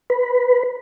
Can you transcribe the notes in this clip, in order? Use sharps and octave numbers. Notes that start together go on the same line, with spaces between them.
B4